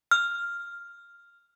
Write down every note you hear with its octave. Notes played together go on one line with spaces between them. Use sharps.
F6